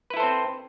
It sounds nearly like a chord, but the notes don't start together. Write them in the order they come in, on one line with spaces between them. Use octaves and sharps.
B4 E4 A4 C5 C4